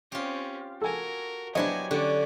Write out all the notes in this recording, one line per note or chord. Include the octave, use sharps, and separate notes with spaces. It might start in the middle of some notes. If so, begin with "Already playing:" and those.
C4 C#4 F4 G4
F#4 A4 A#4 G#5
F#3 B3 D4 E4 G4 C5 D#5 G#5
D3 C#4 F#4 G4 D5